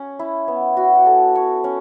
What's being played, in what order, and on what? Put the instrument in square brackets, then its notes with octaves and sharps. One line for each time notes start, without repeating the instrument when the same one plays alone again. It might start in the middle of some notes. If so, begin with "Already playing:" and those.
Already playing: [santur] C#4 C#5
E4
B3
F#4
A4
C#5
C#4